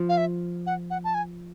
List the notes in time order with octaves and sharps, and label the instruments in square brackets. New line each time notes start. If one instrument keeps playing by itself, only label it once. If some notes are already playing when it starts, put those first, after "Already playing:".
Already playing: [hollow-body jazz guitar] F3
[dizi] F5
E5
F#5
F#5
A5
G#5